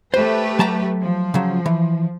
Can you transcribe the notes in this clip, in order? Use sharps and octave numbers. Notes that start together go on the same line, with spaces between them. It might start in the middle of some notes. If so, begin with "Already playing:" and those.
A3 G4 B4 C5
F#3 A5 A#5
F3
C#3 F#3
E3